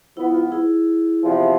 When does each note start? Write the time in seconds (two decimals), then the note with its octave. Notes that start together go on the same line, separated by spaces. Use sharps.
0.17 G#2 F3 B3 E4
0.34 F4
0.52 E4 G#4
1.23 E2 C3 F3